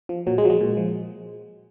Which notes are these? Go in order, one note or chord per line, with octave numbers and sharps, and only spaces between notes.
F3
A#2 F#3
G#3
F3 F#3
G#3
A#2
F3